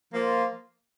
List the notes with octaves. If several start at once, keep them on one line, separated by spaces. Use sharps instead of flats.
F3 A#3 F4